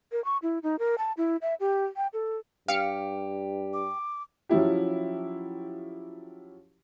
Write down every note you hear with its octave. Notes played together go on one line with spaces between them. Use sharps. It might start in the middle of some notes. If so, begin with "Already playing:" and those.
A#4
C#6
E4
D#4
A#4
A5
E4
E5
G4
G5
A4
G2 G4 F5 C#7
D6
F3 F#3 C#4 E4 G4